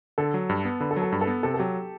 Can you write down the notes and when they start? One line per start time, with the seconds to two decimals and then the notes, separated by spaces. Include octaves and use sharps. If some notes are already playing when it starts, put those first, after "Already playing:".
0.18 D3 A4
0.34 F#3
0.49 G2
0.65 B3
0.80 D3 B4
0.91 A4
0.97 F#3
1.02 A4
1.11 G2 B4
1.21 A4
1.27 B3
1.43 C3 A4
1.54 A4
1.59 F#3 G4